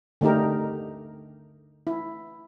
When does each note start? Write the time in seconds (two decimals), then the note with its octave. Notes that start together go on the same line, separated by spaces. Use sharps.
0.21 D3 A3 D#4 G4 A#4
1.87 E4